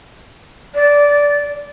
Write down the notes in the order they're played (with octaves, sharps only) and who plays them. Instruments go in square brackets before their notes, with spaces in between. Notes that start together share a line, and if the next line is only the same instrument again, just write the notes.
[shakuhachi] D5